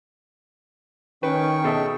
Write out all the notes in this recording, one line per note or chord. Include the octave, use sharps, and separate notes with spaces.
D#3 C#4 B4 G5 C#6
B2 G#4 A4 E5